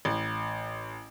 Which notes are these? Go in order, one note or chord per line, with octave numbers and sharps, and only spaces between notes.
A1